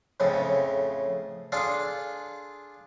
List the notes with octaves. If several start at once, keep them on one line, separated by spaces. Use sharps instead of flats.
F2 A2 C#3 E4
D4 F4 G#4 A4 D5